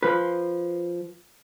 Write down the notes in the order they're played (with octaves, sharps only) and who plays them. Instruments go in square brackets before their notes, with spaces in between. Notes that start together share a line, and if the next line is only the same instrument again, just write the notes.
[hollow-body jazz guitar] F3 B4